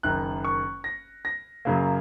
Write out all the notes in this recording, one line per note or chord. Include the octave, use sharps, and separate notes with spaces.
F#1 F#2 D#3 F#6
C#6
A#6
A#6
F#2 C#3 F#3 A#3